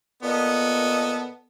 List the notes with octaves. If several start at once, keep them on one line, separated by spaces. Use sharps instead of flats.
A#2 B3 A4 D#5